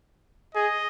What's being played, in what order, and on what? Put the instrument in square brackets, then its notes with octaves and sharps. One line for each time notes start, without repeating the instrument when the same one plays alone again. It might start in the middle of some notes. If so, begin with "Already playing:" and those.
[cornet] G#4 [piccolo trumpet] D#5